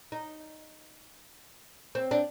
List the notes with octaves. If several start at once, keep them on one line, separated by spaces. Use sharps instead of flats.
D#4
C4
D4